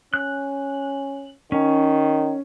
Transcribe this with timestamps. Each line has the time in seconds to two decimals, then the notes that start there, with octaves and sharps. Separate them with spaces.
0.14 C#4 F#6
1.52 D#3 C#4